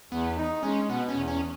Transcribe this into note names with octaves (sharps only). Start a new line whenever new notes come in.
E2 B3
D#4
G#3 C#4
B2 B3
C#4
E2
C#4